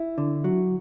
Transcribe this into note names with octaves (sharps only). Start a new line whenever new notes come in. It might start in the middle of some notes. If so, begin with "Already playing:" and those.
Already playing: E4
D3
F#3